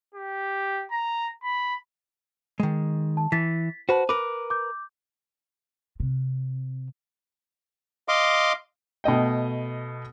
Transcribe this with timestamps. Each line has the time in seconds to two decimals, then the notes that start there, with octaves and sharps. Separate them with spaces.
0.15 G4
0.91 A#5
1.43 B5
2.60 D#3 G#3
3.17 A5
3.32 E3 A6 B6
3.89 F#4 B4 C5 A5
4.09 A#4 B4 D6
4.50 D6 G6
6.00 C3
8.08 D#5 F5 C6 D6
9.04 B2 A3 D#5 G5